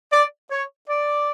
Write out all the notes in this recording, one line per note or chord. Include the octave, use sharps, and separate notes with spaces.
D5
C#5
D5